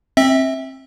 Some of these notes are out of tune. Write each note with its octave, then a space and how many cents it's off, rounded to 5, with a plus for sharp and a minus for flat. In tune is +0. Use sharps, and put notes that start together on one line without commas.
C4 +25 E5 -20